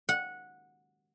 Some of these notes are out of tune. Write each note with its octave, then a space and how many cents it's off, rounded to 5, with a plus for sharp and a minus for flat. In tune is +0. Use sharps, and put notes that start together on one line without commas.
F#5 -15